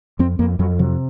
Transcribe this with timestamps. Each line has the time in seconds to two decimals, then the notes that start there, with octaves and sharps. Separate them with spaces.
0.19 F2 C4
0.39 F2 A#3
0.59 F2 F#3
0.79 C3 F#3